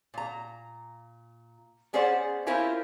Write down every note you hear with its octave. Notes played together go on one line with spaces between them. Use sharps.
A#2 A#5
B3 C#4 G#4 C5 D5 F#5
C#4 E4 F4 G4 A#4 C5